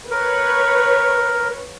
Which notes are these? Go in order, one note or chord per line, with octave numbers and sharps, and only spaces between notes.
A#4 B4 C#5